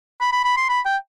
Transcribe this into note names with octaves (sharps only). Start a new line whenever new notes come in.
B5
B5
B5
C6
B5
G5